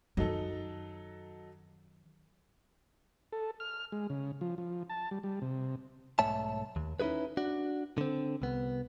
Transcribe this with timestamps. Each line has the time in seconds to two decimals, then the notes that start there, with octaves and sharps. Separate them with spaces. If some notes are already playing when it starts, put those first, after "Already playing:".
0.17 F#2 D#3 F#3 D#4 A4
3.32 A4
3.60 F6
3.92 G#3
4.10 C#3
4.41 F3
4.58 F3
4.89 A5
5.11 G3
5.23 G3
5.42 C3
6.19 B1 G#2 A3 C#5 E5 A5
6.76 D#2
7.00 C#4 D#4 E4 G#4 B4
7.37 D4 F#4
7.98 D3 C4
8.42 C2 B3